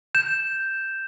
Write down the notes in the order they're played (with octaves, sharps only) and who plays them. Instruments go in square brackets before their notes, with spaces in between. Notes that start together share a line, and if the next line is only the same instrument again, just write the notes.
[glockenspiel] G6 E7